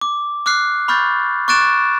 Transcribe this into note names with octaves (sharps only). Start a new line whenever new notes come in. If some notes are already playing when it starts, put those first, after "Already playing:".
D6
D6 F6 F#6 C7
B5 C#6 F6 G6 A6
C#6 D6 F#6 A6 D7 E7